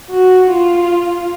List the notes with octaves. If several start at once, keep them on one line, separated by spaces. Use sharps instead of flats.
F#4
F4